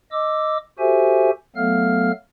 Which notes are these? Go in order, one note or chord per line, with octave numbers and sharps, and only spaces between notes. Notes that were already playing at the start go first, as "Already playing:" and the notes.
D#5 D6 E6
F#4 G4 A4 C5 E5 G#5
F#3 A3 B3 A4 F5 F6